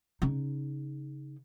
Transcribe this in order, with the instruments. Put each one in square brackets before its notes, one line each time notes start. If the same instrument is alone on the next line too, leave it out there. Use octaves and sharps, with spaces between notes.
[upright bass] C#3 D#4